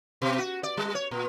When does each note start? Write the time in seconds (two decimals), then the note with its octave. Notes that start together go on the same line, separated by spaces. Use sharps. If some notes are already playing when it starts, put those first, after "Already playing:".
0.22 B2
0.39 F#4
0.63 D5
0.77 G3
0.95 C#5
1.11 A#2